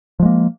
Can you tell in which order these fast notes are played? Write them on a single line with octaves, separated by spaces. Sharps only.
F3 G#3 A#3